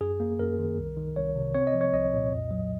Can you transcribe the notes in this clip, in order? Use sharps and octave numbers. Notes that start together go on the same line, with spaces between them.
F#2 G#4
A#3
F#2 A#4
D#3
C2
D#3
C2 C#5
C3
C4 C#5
D#5
F3
C#5
C2 D#5
A#2
F2
F#3